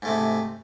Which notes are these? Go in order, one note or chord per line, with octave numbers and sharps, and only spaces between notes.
G#2 C3 A3